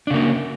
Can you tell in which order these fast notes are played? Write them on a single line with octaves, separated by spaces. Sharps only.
D4 C#3 A#3